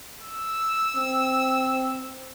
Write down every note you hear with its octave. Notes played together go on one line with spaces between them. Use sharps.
E6
C4